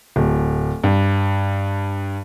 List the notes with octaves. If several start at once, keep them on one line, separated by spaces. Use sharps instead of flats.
D1
G2